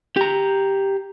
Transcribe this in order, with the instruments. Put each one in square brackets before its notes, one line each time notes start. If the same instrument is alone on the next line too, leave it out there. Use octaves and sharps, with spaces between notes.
[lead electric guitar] G4 A#5